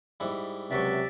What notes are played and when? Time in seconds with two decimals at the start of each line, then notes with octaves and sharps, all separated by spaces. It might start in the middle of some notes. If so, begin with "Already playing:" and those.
0.20 G#2 G3 E4
0.71 C#2 C3 F#3 D5 E5 C#6